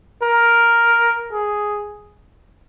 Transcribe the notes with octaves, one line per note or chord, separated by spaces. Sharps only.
A#4
G#4